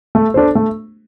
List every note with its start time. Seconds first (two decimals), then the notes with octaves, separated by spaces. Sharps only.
0.15 A3
0.34 D4 A4 C5
0.55 A3